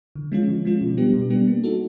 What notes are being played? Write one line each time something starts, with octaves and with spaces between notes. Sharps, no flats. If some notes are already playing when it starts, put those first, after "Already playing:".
D3
F3 G#3 C#4 F4
D3
F3 G#3 C#4 F4
B2
G3 B3 D4 G4
B2
G3 B3 D4 G4
A#3
D#4 F#4 A4